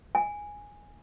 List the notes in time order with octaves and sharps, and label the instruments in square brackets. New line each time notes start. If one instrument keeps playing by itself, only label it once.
[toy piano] G#5